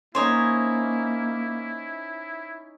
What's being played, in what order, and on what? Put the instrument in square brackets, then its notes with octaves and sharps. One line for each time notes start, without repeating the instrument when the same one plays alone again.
[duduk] A#3 [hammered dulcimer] C#4 D#4 [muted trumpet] E4 [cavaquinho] C5 C#5 D#5